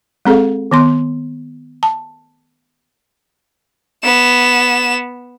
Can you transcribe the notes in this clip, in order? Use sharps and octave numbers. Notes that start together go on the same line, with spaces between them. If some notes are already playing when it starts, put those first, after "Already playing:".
G#3 C4 G#4 A4 F5
D#3 B3 C6
A5
B3 E7